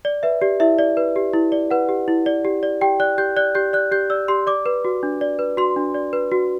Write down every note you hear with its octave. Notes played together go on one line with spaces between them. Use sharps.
D5
B4 E5
G4 D5
E4 E5
D5
B4
G4
E4
D5
B4 F#5
G4
E4
D5
G4
D5
G4 G5
D5 F#6
G4 G6
D5 F#6
G4 G6
D5 F#6
G4 G6
D5 E6
G4 C6
D5 D6
B4
F#4
D4
D5
B4
F#4 C6
D4
D5
B4
F#4